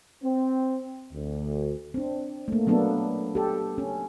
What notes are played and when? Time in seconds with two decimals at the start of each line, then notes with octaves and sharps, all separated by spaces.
0.24 C4
1.14 D2
1.94 C4 D4
2.48 A3 A#3
2.67 F#3 A#3 B3 D4 A4
3.35 G4 A4
3.78 C#4